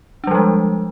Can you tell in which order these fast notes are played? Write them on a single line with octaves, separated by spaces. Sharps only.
D4 G3 F3 G#3